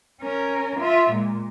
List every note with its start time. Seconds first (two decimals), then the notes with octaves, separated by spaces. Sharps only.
0.22 C#4 A#4
0.80 F4 E5
1.10 A#2 G#3